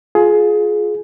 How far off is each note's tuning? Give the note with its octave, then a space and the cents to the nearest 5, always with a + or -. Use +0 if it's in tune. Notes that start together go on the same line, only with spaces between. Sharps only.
F4 +15 G#4 +20